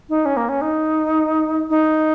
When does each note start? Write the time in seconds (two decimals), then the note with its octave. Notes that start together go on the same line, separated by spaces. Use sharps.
0.09 D#4
0.25 C#4
0.37 A#3
0.49 C#4
0.61 D#4
1.70 D#4